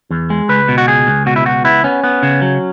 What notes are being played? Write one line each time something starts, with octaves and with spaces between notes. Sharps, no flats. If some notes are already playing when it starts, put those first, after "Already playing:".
E2
G#3
C#2 B4
B2
F#4
C#2 G#4
C#2
B2 F#4
E4
C#2 F#4
B3 E4
B3 C#4
B3
C#3
F#3